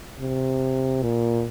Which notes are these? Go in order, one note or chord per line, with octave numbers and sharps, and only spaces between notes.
C3
A#2